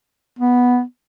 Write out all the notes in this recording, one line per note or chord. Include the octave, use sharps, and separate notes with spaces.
B3